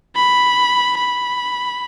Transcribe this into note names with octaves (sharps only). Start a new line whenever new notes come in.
B5
B5